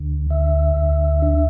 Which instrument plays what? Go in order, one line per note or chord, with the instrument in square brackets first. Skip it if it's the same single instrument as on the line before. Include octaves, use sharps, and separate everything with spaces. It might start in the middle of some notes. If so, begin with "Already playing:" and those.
Already playing: [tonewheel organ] D2 D3
D3 E5
D2
D4